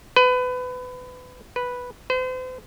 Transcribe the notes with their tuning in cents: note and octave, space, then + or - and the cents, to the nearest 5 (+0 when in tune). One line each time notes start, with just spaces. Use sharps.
B4 +25
B4 -5
C5 -40